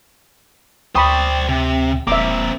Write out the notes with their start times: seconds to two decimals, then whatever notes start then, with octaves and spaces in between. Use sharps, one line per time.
0.95 D2 C5 D5 G5 B5 C#6 D#6
1.49 C3
2.07 E1 A#3 C4 E5 D6